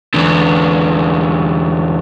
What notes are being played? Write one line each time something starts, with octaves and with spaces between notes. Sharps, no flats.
E2 D3